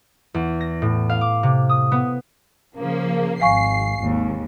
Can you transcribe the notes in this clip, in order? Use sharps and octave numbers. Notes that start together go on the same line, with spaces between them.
E2
A#6
A2
F5
D6
C3
D#6
B3
C#3 F3 A#3
G#1 F5 G#5 C#6 C7
G#1 D#2